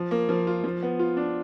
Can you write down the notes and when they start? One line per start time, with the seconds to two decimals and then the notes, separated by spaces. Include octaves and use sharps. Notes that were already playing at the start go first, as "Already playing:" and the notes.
Already playing: F3
0.11 A#3
0.29 F3
0.47 F4
0.64 F3
0.83 B3
0.99 F4
1.17 D4